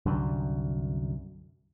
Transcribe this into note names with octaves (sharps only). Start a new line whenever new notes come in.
C2 F#2 D3